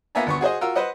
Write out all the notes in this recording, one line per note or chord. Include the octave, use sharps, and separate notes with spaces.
A#3 B3 F4 E5 G#5 A#5
D2 B3 C#6
F#4 G#4 C5 D#5
F4 F#4 A#4 E6
B4 C5 D#5 F#5